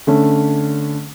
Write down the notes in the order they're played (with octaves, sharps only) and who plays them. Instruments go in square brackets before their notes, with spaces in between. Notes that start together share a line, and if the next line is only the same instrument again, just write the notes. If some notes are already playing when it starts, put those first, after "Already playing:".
[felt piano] D3 A3 C#4